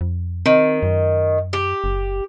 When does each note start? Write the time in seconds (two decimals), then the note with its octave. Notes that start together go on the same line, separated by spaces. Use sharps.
0.01 F2
0.46 D#3 C4
0.83 F#2
1.53 G4
1.84 F#1